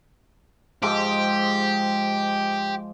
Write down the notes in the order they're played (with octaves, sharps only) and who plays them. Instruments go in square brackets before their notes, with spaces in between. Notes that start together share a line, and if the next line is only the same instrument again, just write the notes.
[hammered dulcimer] G#2 F3 G#3 [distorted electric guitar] G4